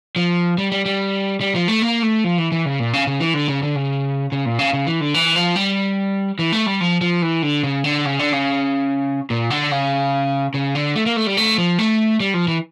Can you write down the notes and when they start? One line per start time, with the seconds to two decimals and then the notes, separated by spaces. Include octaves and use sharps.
0.16 F3
0.58 G3
0.72 G3
0.86 G3
1.41 G3
1.55 F3
1.68 A3
1.82 A#3
2.03 A3
2.24 F3
2.38 E3
2.52 E3
2.65 C#3
2.79 A#2
2.93 C#3
3.07 C#3
3.20 E3
3.34 D3
3.48 C#3
3.63 D3
3.76 C#3
4.32 C#3
4.45 A#2
4.59 C#3
4.73 C#3
4.87 E3
5.01 D3
5.14 E3
5.36 F3
5.56 G3
6.39 E3
6.52 A3
6.66 G3
6.81 F3
7.01 F3
7.22 E3
7.43 D3
7.63 C#3
7.84 D3
8.05 C#3
8.19 D3
8.32 C#3
9.30 A#2
9.50 D3
9.71 C#3
10.54 C#3
10.75 D3
10.96 A3
11.06 A#3
11.16 A3
11.27 G3
11.37 A3
11.58 F3
11.79 A3
12.20 G3
12.34 F3
12.48 E3